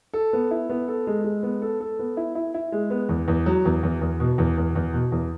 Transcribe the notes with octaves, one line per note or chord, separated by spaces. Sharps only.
A4
B3
E4
B3
A4
G#3
G#3
B3
A4
A4
B3
E4
E4
E4
G#3
B3
E2
E2
F#3
E2
E2
E2
B2
E2
E2
E2
B2
E2